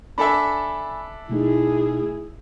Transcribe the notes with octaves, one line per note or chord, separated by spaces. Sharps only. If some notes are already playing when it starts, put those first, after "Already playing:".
D4 A4 E5 G#5 B5
B2 A3 D#4 E4 G#4